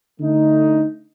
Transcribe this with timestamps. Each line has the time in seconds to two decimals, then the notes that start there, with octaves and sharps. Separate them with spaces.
0.19 D3 A3 D#4